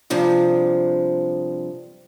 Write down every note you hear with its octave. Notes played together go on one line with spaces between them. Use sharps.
G2 C3 F3 G#3